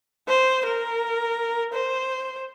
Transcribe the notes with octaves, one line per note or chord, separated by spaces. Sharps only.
C5
A#4
C5